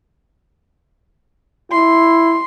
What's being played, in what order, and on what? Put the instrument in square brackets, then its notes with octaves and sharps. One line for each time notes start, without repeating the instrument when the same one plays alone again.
[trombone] E4 [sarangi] C6